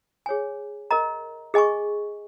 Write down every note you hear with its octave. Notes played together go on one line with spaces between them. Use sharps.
G#4 C#5 G#5
A#4 D#5 A#5
G#4 D#5 G#5 C#6